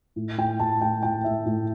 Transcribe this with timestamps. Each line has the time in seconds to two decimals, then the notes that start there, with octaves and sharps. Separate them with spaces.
0.16 A2
0.38 A2 G5
0.59 A2 A5
0.81 A2 G5
1.03 A2 G5
1.24 A2 E5
1.46 A2